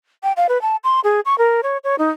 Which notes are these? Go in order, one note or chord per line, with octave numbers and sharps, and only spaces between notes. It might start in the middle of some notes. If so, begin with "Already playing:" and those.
G5
F5
B4
A5
C6
G#4
C#6
A#4
C#5
C#5
D#4